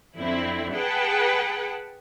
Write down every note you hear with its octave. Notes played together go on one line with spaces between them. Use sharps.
F2 D3 C4 E4
G#4 B4 F#5 G5 A5